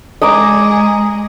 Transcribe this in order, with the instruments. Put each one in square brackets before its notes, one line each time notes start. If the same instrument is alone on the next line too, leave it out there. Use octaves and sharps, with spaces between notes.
[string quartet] G#3 G#4 [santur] D#5 A#5 D6